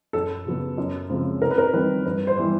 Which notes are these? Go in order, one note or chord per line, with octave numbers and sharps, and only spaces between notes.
F#2 A4
C#3 F#3 B3
F#2
C#3 F3 G#3 C4
C3 A#4
B4
A#4
D#3 G3 C4 B4
G2 B4
C5
E3 G3 B3